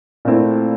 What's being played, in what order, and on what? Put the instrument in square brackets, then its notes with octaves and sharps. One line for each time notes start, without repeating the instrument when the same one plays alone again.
[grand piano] A#2 A3 C4 E4